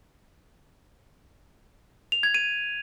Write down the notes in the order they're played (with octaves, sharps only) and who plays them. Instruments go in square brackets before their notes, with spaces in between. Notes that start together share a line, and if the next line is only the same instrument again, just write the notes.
[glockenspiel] F7
G#6
D#7